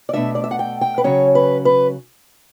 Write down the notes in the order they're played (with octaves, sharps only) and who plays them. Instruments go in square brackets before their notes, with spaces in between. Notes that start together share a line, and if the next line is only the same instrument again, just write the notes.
[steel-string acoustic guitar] D5
B2 A3 D4 E5
D5
E5
F#5
G5
G5
B4
C#3 F#3 C#4 C#5
B4
B4